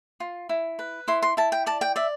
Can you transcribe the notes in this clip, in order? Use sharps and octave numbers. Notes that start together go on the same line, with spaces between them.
F4
E4
B4
E4 C6
C6
E4 A5
G5
D5 A5
G5
D5 E5